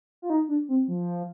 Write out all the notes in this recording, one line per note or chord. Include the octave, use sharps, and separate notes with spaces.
F4
D#4
D4
C4
F3